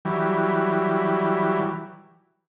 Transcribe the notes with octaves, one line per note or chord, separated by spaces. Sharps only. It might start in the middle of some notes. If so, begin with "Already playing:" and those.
E3 F#3 G3